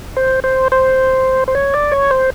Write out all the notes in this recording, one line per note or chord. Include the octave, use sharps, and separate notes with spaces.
C5
C5
C5
C5
C#5
D5
C#5
C5